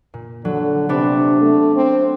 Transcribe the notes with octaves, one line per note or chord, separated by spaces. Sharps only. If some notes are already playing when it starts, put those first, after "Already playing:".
A#2
D3 F#3
C3 B3 D4
A3
C4